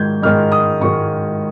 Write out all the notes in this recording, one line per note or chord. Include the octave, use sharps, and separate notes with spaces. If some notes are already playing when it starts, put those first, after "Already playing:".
Already playing: G#2 D#3 G#3 G6 G#6
G#2 D#3 G#3 F6
D#6
G#2 D#3 G#3 C#6